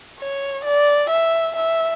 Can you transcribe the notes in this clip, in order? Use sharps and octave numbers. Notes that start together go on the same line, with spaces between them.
C#5
D5
E5
E5